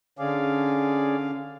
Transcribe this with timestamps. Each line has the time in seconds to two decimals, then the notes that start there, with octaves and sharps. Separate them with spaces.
0.19 D3 C#4 G#4 D5 F5